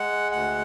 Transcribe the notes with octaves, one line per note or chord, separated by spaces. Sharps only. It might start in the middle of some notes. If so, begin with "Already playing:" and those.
Already playing: G#3 F#5
D2 F#5